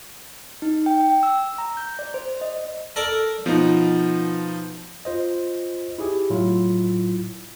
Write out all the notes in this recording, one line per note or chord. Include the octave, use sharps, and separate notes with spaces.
D#4
G5
G5
E6
A#5
G6
D5
C5
D#5
A4 A#4 D5
B2 F3 D#4
F4 C5 D#5
E4 G4 G#4
A2 F#3 E4 F4